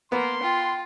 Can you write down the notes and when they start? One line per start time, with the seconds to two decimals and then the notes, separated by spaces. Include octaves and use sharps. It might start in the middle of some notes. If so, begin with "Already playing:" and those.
0.12 A#3 B3 C6
0.43 F4 G5